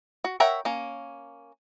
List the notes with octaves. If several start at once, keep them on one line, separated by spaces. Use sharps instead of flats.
F#4
A#4 C#5 E5 F#5 G5
A#3 C#4